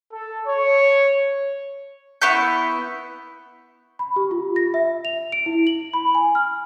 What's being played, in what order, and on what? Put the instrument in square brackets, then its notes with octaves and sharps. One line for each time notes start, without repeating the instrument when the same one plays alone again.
[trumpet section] A4
C#5
[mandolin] B3 E4 C#6 G6
[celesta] B5
G4
F4
A#6
E5
F7
D7
E4
F#7
B5
G#5
F6